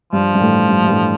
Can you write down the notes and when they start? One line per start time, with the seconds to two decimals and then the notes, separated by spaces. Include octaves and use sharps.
0.13 G2 F3
0.35 G2
0.41 A2
0.69 G2
0.84 G2
0.89 A2